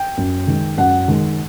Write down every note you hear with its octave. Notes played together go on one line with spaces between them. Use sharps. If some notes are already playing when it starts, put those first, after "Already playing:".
Already playing: G5
F#2
D#3 G#3
F#2 F#5
D#3 G#3